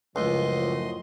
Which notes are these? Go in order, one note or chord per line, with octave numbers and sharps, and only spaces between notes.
C#2 F#2 A2 F3 D#5 C6